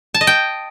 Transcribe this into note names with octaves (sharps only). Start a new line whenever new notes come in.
A5
D#5
G5